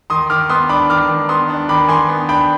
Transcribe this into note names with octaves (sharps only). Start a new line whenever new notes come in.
D#3 C6 D#6
D#3 D6 F6
B3 C6 D#6
D4 B5 D6
D#3 D6 F6
D#3
B3 C6 D#6
D4
D#3 B5 D6
D#3 G#5 C6
B3
D4 G5 B5